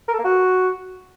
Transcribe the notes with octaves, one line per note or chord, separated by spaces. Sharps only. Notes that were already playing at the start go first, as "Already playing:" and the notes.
A#4
A4
A#3
F#4